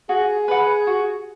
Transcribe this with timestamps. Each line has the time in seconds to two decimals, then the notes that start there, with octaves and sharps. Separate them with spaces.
0.09 F#4 G#4
0.48 B4 F#5
0.87 F#4